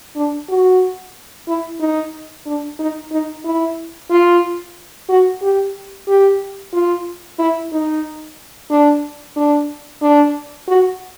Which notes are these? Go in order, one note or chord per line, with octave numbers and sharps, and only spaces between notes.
D4
F#4
E4
D#4
D4
D#4
D#4
E4
F4
F#4
G4
G4
F4
E4
D#4
D4
D4
D4
F#4